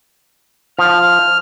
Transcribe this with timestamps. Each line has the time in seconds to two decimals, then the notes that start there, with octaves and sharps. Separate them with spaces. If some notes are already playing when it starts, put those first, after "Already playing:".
0.79 F3 F6